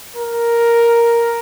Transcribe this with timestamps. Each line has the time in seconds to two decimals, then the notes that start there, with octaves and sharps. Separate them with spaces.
0.16 A#4